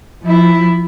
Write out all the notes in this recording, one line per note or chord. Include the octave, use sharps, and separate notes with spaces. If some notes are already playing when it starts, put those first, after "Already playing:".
F3 E4